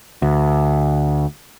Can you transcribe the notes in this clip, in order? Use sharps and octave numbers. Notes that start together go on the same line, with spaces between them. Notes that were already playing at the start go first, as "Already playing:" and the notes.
D2